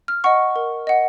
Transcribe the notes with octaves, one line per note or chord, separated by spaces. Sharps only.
F6
D#5 F#5 C#6
A#4
D#5 F#5